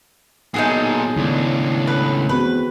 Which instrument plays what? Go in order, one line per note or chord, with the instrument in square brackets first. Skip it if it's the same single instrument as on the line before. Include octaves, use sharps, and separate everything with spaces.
[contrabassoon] B1 [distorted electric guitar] A#2 A4 [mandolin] D#4 F#4 G#4
[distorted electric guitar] C#2 D4 [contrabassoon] A2 [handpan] D#3 G#3 B3
[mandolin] B4
[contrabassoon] E2 [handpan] C4 F#4 [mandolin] B4